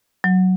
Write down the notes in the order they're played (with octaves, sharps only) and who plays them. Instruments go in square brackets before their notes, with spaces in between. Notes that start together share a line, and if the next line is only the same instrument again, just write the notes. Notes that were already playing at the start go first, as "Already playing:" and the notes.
[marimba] F#3